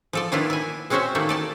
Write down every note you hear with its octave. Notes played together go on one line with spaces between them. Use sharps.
F3 A4 D5
D#3 A#3 B3 D4 E4 F4
E4 G#5
G#3 C4 C#4 F#4 C5 E5
D#3 A3 A#3 E4
A4 D5 A5